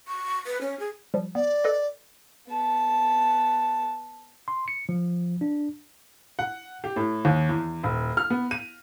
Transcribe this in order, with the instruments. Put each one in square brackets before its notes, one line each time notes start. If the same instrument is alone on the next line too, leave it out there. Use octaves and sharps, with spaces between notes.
[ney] C#6
B4
C#4
G#4
[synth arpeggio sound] F3 G3
[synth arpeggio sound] B3 [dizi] D5
[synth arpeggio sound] A4 B4 D#5
[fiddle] B3 A5
[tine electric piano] C6
C#7
F3
D4
[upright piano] F#5
G4
A2
D#2
E2
D#1
F6
B3
D#7